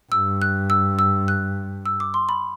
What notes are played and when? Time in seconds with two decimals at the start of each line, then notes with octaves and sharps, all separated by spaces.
0.12 G2 E6
0.42 F#6
0.70 E6
0.99 E6
1.28 F#6
1.86 E6
2.00 D6
2.14 C6
2.29 B5